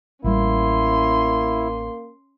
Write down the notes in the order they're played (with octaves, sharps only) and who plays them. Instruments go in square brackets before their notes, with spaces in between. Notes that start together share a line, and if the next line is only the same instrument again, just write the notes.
[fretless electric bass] A1 G3 [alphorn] A#3 [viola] C#4 C6 [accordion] E4